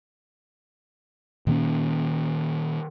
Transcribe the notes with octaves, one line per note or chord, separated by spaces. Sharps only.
A#2 D#3 A#3 C#4